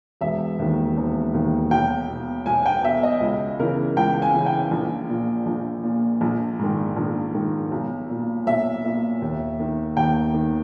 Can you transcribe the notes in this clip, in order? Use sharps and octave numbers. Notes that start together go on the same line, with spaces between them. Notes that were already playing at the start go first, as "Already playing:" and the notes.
E1 E5
D#2 D#3
E1
D#2 D#3
B1 G5
B2
B1 G#5
G5
B2 E5
D#5
C#2
C#3 E3 A#4
C#2 G5
G#5
C#3 E3
G5
A#1
A#2
A#1
A#2
A#1
G#2 D#3
A#1
G#2 D#3
B1
A#2
B1 E5
A#2
D#2
D#3
D#2 G5
D#3